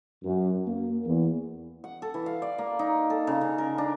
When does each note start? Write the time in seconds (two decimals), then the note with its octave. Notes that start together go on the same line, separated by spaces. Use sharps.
0.24 F#2
0.66 A#3
1.05 E2
1.84 F#5
2.02 A4
2.14 E3
2.26 F5
2.42 D5
2.58 A#3
2.79 D#4
3.10 A4
3.27 C#3
3.41 C#3
3.58 A#4
3.78 D4